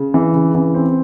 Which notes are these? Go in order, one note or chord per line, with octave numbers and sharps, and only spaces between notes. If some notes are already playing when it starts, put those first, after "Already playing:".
Already playing: C#3
E3
C#3
E3
C4